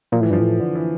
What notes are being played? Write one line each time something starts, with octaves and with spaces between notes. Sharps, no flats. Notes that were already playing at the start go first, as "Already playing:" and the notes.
A#2 F3
A2 E3
G2 F3
A2
D3
E3